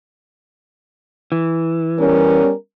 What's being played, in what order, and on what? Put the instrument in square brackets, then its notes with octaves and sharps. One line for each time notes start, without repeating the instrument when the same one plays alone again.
[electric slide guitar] E3
[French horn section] G3 B3 C#4 [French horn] A#4